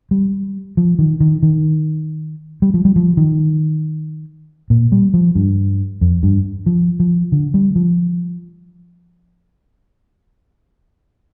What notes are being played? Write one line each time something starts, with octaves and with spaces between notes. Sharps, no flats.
G3
F3
D#3
D#3
D#3
G3
F3
G3
F3
D#3
A#2
G3
F3
G2
F2
G2
F3
F3
D3
G3
F3